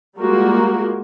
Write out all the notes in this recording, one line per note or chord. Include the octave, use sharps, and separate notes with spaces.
G3 G#3 A#3 F4 F#4 A#4